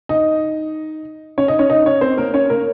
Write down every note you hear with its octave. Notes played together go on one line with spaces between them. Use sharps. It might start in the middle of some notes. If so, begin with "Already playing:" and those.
D#4 D#5
C#4 C#5
D#4 D#5
C#4 C#5
D#4 D#5
C#4 C#5
C4 C5
A#3 A#4
C#4 C#5
A#3 A#4